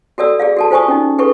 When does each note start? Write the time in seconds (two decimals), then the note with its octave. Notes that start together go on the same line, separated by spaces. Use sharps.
0.18 F#4 A4 D5 E6
0.39 G#4 D5 F5
0.57 F#4 A4 A5
0.71 F4 C5 G#5 C#6 D#6
0.88 C#4 D#4
1.18 G#4 A4 B4 C#6